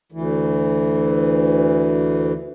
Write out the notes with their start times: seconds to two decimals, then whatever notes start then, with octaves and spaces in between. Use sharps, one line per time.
0.12 D2 E3